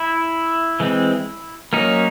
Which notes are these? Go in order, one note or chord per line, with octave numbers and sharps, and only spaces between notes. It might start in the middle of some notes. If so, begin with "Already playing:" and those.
Already playing: E4
E3 G#3 C4
F#3 A#3 C#4 D#4